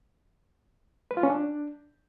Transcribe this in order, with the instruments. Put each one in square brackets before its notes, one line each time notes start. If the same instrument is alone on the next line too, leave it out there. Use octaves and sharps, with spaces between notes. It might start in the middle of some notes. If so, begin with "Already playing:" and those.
[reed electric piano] B4
F4
C#4
D4